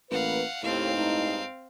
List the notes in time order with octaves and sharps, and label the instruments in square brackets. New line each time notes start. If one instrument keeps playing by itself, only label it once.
[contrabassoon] A1 [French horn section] A#3 B4 [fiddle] F5 F#5
[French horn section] D#2 [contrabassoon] A2 [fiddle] C4 F5
[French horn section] G2 G#3 D#4